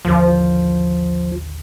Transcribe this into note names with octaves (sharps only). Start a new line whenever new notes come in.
A1 D#2 D3 F3